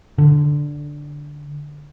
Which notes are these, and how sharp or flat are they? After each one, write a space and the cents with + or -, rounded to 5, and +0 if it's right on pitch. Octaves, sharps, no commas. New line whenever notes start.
D3 +0